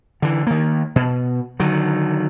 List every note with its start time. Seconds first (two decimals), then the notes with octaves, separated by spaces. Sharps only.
0.22 D3 E3
0.47 D#3 A#3
0.96 B2
1.60 D3 D#3 F#3